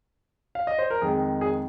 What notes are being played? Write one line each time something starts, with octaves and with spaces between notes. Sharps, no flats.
F5
D#5
C5
A#4
F2 D#3 G#3 G#4
G#4